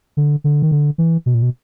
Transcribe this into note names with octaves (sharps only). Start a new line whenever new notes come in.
D3
D3
D#3
D3
E3
B2
A#2
B2